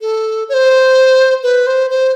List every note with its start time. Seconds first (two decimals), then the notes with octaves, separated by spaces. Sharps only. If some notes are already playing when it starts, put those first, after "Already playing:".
0.01 A4
0.49 C#5
0.54 C5
1.43 B4
1.67 C5
1.90 C5